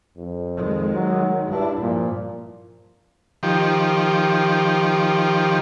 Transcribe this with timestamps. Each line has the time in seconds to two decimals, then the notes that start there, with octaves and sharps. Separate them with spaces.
0.17 F2
0.56 D#3 G#3
0.94 F#3
1.50 G2 D4 E4
1.81 G2 A#2 F3
3.43 D#3 F3 G4